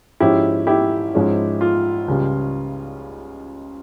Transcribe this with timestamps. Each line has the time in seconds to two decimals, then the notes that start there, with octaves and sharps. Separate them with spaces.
0.20 G#2 F3 G#3 C#4 E4 G4
0.67 E4 G4
1.14 G#2 F3 G#3 C#4
1.61 F4
2.08 C#2 C#3 G3